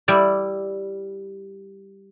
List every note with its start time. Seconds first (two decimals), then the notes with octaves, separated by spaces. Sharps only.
0.08 G3 E4 D5